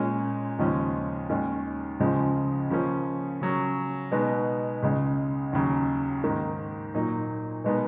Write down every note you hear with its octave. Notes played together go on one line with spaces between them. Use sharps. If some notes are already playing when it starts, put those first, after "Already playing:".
Already playing: A#2 G#3 C#4
D#2 C#3 F3 G#3 C#4
D#2 D#3 G#3 C#4
C#2 C#3 F3 G#3
C#3 F3 A#3 C#4
C#3 F#3 C#4
B2 G#3 B3 D#4
C#2 C#3 G#3
D#2 C#3 F#3
G#2 D#3 A#3
A#2 F#3 A#3 D#4
B2 G#3 B3 D#4